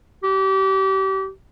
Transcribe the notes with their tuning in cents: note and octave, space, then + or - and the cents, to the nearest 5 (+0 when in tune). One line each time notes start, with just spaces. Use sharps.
G4 -30